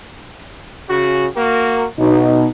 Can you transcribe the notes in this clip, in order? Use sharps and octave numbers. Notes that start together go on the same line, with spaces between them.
C#3 F#4
A#3 F#4 A#4
B1 B2 D#4